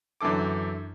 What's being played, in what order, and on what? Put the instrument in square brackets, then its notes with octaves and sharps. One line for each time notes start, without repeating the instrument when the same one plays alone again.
[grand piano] F#2 D3 E3 A4 D6